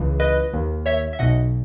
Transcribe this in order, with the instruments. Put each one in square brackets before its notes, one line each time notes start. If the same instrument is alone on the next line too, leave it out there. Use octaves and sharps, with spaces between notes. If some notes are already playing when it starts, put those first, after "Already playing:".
Already playing: [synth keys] C#2 C#3 E3
B4 D#5
D#2 D#3
C#5 E5
E5
B1 B2 D#5 F#5